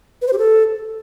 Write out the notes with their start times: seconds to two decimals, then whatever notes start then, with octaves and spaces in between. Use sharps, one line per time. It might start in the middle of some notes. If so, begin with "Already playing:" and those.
0.22 B4
0.27 C5
0.33 G4
0.39 A4